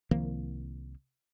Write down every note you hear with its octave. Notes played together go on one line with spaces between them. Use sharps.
C2 D#3 F3 A#3